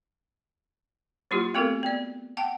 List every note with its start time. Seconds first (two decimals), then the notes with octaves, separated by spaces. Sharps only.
1.31 F#3 A#3 E4 F4 G4
1.54 A3 B3 C4 F#4 A4 A#4
1.83 B3 D5
2.37 F#5 G5 A5